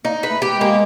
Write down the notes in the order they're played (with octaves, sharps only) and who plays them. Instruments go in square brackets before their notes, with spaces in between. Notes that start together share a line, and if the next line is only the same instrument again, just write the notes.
[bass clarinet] A#3 [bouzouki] D#4
[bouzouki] B4
[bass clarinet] A3
[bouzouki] G4
[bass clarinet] G#3
[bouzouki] A#3